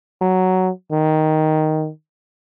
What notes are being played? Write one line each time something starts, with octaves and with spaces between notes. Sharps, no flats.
F#3
D#3